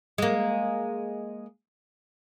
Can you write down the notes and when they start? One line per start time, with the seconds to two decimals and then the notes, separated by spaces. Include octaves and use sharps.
0.18 G#3 A#3